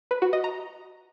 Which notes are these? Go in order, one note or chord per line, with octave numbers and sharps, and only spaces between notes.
B4
F#4
D#5
A#5